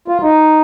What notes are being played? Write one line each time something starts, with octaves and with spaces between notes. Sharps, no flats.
F4
D#4